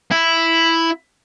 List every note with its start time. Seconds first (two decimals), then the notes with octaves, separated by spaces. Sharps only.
0.12 E4